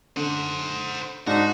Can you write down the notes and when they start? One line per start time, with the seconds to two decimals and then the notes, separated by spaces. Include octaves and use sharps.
0.17 D3 C5 F#5
1.27 G#2 D4 D#4 F#4